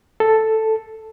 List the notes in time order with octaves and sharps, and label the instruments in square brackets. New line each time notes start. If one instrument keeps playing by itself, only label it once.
[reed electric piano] A4